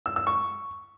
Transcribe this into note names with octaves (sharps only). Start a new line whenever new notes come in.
E6
E6
C#6